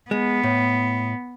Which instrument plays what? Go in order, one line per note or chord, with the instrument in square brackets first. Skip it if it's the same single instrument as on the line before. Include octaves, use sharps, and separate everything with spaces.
[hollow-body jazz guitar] G#3 [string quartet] B3
[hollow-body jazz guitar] A2